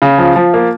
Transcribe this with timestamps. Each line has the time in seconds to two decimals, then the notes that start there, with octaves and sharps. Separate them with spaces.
0.02 C#3
0.18 F3
0.36 F3
0.54 A#3